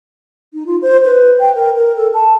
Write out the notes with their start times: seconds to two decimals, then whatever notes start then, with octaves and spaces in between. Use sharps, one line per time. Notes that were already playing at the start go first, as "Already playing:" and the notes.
0.54 D#4
0.66 F4
0.82 C5
1.05 B4
1.40 G5
1.55 A#4
1.77 A#4
1.96 A4
2.14 A5